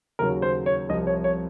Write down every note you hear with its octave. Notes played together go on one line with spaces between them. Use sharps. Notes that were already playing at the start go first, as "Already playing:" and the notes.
D#2 C#3 F#3 A#4
C5
C#5
C2 C3 F3 D#5
C#5
C#5